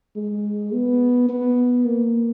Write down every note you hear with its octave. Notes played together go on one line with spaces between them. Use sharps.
G#3
B3
B3
A#3